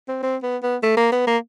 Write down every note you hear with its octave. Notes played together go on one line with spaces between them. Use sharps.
C4
C4
B3
B3
A3
A#3
B3
A#3